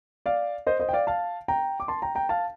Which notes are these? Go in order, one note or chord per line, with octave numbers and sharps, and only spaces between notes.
D5 F5
C5 D#5
C5 D#5
G5
D5 F5
F5 A5
G5 A#5
D6
A5 C6
G5 A#5
G5 A#5
F5 A5